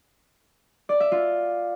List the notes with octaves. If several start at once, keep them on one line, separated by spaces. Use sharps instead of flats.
D5
E5
F4